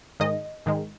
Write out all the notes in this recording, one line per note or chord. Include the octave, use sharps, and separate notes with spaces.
G#2 D#3 G#3 D#5
G#2 D#3 G#3